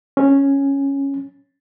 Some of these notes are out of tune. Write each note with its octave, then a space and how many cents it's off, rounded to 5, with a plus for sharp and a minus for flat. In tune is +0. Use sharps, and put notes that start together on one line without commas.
C#4 -5